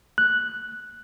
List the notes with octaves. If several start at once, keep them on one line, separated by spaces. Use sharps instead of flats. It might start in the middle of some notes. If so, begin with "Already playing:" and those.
F#6